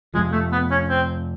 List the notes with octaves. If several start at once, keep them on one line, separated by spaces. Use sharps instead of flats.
F2 C3 F3 G#3
A3
B3
C#4
C4